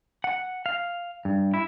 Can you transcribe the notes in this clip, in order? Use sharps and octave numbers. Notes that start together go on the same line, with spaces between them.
F#5
F5
G2
E4